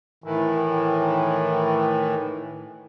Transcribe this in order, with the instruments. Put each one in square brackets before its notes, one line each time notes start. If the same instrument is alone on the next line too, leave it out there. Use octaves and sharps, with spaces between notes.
[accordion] A2 D#3 E3